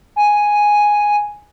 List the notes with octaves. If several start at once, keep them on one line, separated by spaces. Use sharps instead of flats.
G#5